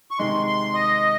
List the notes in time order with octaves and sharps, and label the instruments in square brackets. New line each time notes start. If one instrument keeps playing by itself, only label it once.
[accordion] C#6
[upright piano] C3 D#3 G#3 D#4 [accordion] C6
[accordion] C6
D#5